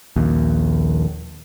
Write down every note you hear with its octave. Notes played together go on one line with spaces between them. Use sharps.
A#1 D#2